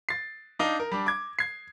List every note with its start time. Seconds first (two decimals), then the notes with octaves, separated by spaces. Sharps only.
0.09 A6 C7
0.59 D4 D#4 F5
0.80 A#4
0.92 G3 D4
1.06 D6 G#6
1.39 G#6 C7